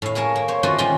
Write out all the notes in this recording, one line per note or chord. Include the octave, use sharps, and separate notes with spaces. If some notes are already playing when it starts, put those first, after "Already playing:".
A2 F5
G#4 A#4 C#5 A5
A#3
C5 C#5
A3 F4 F#4 C5 D5 D#5
A#2 D#3 G3 C#4 F4